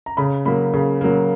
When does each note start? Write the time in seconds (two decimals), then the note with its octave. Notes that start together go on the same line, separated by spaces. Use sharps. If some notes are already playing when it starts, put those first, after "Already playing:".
0.06 A#5
0.17 C#3 B5
0.45 F#3 A#3 B5
0.74 C#3
1.01 F#3 A#3